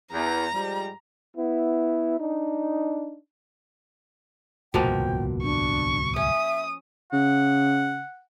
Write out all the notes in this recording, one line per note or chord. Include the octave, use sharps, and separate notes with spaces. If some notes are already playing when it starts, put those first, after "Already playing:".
E2 A#5
G#2 F3 G3
B3 E4
D4 D#4
D1 C2 G2 B2 F3 A#3 G5
D4 C#6
C#4 E5 D#6
C#3 F#5